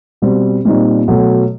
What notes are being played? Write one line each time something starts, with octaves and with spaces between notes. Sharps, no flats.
B2 G3 C4
A#2 G3 C4 D#4
B2 F#3 A3